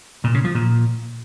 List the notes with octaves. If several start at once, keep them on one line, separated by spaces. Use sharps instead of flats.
A#2
C#3
F3
A#2